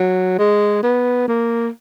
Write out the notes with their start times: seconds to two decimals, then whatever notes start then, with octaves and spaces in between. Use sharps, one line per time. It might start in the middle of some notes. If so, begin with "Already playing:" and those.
Already playing: F#3
0.39 G#3
0.83 B3
1.28 A#3